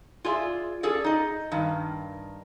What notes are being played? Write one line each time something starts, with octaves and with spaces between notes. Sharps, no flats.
F4 G#4 D5 E5
C#4 G#4 A4 D5
D#4 D#5
G2 D#3